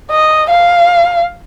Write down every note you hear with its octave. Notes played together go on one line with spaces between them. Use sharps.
D#5
F5